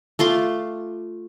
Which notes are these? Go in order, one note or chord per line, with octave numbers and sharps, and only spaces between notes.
A3 F4 C6 D6